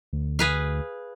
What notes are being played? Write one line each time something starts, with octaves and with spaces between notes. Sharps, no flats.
D2
G#4 B4 F5